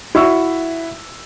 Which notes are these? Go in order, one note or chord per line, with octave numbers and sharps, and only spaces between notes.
E4 F#4 E5 C#6 E6